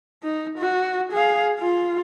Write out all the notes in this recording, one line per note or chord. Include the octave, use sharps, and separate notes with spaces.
D#4
F#4
G#4 F5
F4